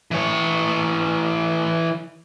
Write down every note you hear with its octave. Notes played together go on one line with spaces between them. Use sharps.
E3 C#5